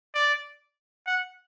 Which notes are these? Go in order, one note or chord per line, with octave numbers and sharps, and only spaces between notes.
D5
F#5